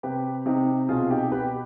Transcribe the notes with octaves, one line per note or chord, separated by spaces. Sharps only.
C3 G4 B4
C3 D#4 G4
B2 F4 G#4
D#4 G4
B2 G4 B4